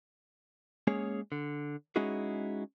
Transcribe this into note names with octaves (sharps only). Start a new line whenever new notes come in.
G#3 A#3 C#4 G#4 C#5
D3
G#3 C#4 D#4 E4 F#4 G#4